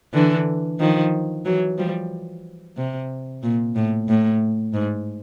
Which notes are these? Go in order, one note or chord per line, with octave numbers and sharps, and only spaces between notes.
D3 E3
D#3 F3
E3 F#3
F3 G3
C3
A#2
A2
A2
G#2